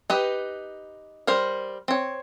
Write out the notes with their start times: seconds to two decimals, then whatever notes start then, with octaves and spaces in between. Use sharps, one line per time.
0.10 D#4 G4 B4
1.27 G3 A#4 C5
1.88 C4 C#5